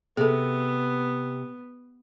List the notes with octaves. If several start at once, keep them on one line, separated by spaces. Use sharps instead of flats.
C3 B3 G#4 A4